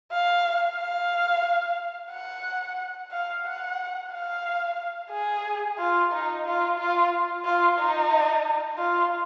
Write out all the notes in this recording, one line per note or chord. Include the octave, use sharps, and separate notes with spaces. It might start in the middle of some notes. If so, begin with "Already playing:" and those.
F5
F5
F#5
F5
F#5
F5
G#4
F4
D#4
F4
F4
F4
D#4
F4